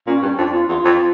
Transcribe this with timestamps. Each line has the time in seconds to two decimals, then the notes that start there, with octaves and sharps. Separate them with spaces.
0.07 A#2 C#4
0.22 G2 C#4
0.37 F2 D4
0.53 F2 F4
0.68 E2 F4
0.84 F2